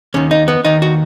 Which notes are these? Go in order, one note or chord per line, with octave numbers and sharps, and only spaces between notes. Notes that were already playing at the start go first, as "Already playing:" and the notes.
D#2 D#3 C#4
D#4
B3
D#2 D#3 D#4
F#4